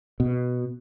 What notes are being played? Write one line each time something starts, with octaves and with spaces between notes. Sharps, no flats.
B2